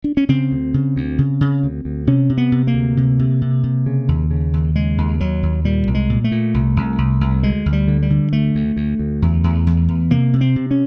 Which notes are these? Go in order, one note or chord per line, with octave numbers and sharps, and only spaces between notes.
D4
C#4
C#3 C4
D2
C#3
D2
C#3
C#3
D2
D2
C3 C#4
C3
B3
C3
A#3
D2
C3
C3
C3
C3
C#3
D#2
C#3
D#2
C#3 G#3
D#2
D#2 F#3
D#2
A#2 G3
C2
G#3
A#2
A3
A#2
C2
C2
C2
C2
D2 G#3
D2
G3
D3
G3
D3
D2 A3
D2
D2
D2
E2
E2
E2
E2
C3 A#3
C3
C4
C3
C#4